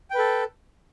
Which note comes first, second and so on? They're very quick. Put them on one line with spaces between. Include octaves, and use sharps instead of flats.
G5 B4 A4